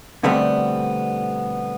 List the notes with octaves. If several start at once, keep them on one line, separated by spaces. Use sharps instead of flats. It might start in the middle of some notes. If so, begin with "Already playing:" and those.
B2 D3 G3 A3 B3 C4